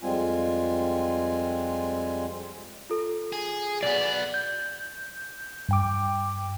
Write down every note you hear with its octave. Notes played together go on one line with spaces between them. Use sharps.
F2 G3 G#3 C4 F4 G#5
F4 A4
G#4
B1 B3 D5
G6
G2 G5 D6